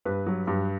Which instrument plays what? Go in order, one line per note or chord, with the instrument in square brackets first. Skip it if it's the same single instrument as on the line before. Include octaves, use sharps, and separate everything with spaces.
[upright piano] G2 B4
F#3
G2